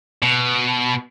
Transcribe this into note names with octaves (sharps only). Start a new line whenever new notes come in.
B2